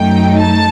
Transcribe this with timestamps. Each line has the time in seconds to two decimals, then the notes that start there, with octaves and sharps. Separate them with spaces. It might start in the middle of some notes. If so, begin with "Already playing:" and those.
Already playing: F#2 F#3 A3 D#4 G5
0.40 A5